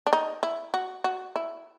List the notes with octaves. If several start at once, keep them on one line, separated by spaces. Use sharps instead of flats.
D4
D#4
E4
F#4
F#4
E4